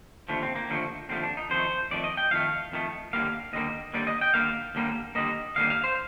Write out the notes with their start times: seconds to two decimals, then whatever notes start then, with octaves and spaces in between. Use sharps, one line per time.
0.29 D#2 D3 F3 A3
0.43 C4
0.56 A#3
0.70 D#2 D3 F3 A3
1.09 D#2 D3 F3 A3 C4
1.23 D4
1.37 D#4
1.50 F2 D#3 A3 C5
1.91 F2 D#3 A3 D5
2.04 D#5
2.17 G5
2.31 F2 D#3 A3 F5
2.72 F2 D#3 A3
3.13 D#2 D3 G3 A#3 F5
3.53 D#2 D3 G3 A#3 D#5
3.93 D#2 D3 G3 A#3 D5
4.07 D#5
4.21 G5
4.34 D#2 D3 G3 A#3 F5
4.75 D#2 D3 G3 A#3
5.15 D#2 D3 G3 A#3 D#5
5.56 D#2 D3 G3 A#3 F5
5.70 F5
5.84 C5